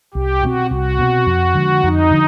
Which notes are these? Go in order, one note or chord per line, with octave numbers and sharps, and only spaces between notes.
C2 G4
B2 G#3 C4 F#4
C2 F#4
B2 G#3 C4
F2
D3 F3 G#3
F2 D#4
D3 F3